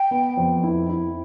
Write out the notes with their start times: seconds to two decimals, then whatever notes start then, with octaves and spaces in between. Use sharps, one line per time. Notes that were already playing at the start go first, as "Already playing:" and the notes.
Already playing: G5
0.11 B3
0.37 F2
0.64 E4
0.89 E4